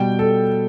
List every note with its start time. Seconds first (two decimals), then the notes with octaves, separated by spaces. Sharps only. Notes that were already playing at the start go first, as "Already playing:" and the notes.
Already playing: B2 G3 G5
0.19 A4